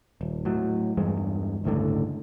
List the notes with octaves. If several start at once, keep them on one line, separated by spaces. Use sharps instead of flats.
D#1
A2 F#3
E2 G2 G#3
G1 C#2 A2 D3